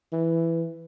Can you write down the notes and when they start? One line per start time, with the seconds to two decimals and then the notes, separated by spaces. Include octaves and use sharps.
0.12 E3